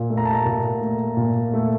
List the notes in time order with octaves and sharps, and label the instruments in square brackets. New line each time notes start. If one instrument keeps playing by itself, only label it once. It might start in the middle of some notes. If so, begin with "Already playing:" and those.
Already playing: [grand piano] A#2
A3
A#5
A5
A#5
A#2
A3
A#2
A3